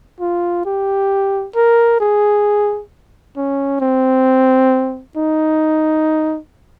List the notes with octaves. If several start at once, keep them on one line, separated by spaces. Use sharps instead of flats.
F4
G4
A#4
G#4
C#4
C4
D#4